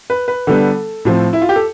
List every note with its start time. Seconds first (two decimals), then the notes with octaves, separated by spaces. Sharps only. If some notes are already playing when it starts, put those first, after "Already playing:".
0.10 B4
0.28 B4
0.47 D3 G3 B3 A4
1.05 A2 F3 C4
1.33 E4
1.42 F4
1.49 G4
1.56 A4